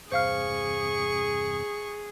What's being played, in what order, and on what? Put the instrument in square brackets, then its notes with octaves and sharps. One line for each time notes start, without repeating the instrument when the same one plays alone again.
[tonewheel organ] E2 G2 C3 [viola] G#4 [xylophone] C5 F5 F6 [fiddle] C#6